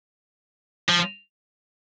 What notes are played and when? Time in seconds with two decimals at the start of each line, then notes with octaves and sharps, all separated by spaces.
0.89 F3